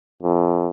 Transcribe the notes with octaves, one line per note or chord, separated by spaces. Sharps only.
F2